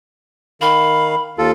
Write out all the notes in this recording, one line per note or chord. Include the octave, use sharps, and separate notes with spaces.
D#3 F5 B5
D#2 F4 A4